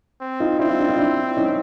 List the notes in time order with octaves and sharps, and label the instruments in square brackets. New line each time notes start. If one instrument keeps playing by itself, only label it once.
[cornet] C4
[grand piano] D#4 F4
[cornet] C4 [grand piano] D4 E4
[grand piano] D#4 F4
D4 E4
D#4 F4
D4 E4
C#4 D#4